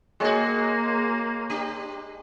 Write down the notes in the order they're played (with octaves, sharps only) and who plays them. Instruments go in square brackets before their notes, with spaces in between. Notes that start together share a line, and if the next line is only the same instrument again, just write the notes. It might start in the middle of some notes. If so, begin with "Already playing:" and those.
[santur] G#3 C#5 G#5 [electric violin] A#3 [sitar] F#4 G#4
[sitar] D4 G4